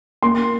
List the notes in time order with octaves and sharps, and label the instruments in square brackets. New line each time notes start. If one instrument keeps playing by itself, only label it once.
[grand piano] A#3 C6